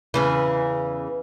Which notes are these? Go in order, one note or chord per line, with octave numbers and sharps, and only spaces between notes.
E2 C#3 E3